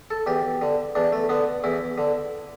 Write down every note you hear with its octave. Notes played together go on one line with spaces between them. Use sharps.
A4
E2 G4
D3
E2 D4
A3
D3 B3
E2 E4
D3